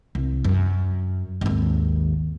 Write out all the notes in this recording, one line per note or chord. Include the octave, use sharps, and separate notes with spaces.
C2
F#2
G#1 D#2